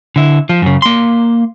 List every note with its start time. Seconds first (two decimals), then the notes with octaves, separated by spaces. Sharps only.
0.16 D3 E4
0.49 F3
0.62 F#2 C#3
0.82 A#3 C6